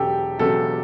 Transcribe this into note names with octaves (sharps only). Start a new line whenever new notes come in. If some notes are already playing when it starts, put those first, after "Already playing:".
Already playing: E1 E2 C#3 F#3 G4 A4
E1 E2 C#3 F#3 A4